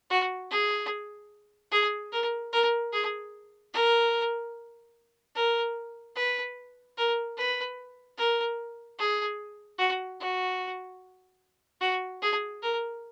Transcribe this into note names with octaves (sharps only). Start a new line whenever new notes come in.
F#4
G#4
G#4
A#4
A#4
G#4
A#4
A#4
B4
A#4
B4
A#4
G#4
F#4
F#4
F#4
G#4
A#4